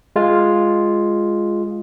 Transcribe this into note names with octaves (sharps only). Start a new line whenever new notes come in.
G#3 F4